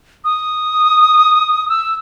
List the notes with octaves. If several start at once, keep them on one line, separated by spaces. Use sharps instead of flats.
D#6
E6